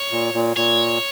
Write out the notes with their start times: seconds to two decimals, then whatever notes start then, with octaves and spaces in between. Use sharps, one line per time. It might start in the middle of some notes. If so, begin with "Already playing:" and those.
Already playing: C#5
0.11 A#2
0.34 A#2
0.57 A#2 C#5